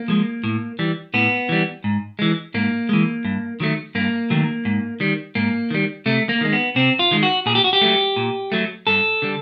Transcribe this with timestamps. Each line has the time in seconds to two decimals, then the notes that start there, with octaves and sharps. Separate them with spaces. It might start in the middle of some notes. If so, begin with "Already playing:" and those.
Already playing: A#3
0.08 F3 G#3
0.44 A2
0.79 E3 G3
1.14 A2 B3
1.49 E3 G3
1.84 G#2
2.19 E3 G#3
2.54 G#2 A#3
2.89 E3 G#3
3.25 G2
3.60 D#3 F#3 A3
3.95 G2 A#3
4.30 D#3 F#3 A3
4.65 G#2
5.00 D#3 G3
5.35 G#2 A#3
5.70 D#3 G3
6.06 C3 A3
6.29 A#3
6.41 D#3 G#3
6.53 B3
6.76 C3 C4
6.99 F4
7.11 D#3 G#3
7.23 F#4
7.46 A#2 G#4
7.55 G4
7.64 F#4
7.73 G4
7.81 F#3 A3
8.16 A#2
8.52 F#3 A3
8.87 G2 A4
9.22 D3 G3